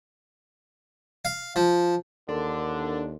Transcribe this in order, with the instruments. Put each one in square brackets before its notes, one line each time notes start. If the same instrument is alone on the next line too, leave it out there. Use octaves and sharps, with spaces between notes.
[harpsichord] F5
F3
[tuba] D#2 [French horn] D3 [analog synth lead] D4 [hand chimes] A4 A#4 C6